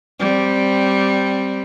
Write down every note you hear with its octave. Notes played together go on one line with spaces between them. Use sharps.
G3 C4